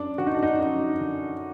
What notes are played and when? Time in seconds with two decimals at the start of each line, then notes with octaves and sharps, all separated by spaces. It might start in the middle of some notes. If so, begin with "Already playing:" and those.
Already playing: F#2 D4
0.18 D3 F#4
0.27 D#4
0.34 D4
0.43 D#4
0.59 F#2 F#4
1.00 D3